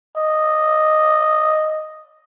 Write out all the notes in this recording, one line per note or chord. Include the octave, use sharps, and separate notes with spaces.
D#5